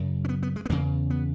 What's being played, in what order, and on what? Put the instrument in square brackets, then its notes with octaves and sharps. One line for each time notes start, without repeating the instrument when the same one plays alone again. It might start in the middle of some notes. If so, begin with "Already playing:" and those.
Already playing: [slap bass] F#2 C#3
C#4
B3
B3
G#3
B3
E2 C#3 A#3
B3